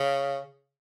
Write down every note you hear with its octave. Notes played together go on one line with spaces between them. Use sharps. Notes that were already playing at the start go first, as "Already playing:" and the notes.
Already playing: C#3